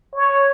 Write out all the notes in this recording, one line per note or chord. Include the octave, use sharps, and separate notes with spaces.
C#5